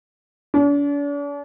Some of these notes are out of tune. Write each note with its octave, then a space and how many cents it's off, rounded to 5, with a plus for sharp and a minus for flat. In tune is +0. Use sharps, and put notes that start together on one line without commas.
D4 -45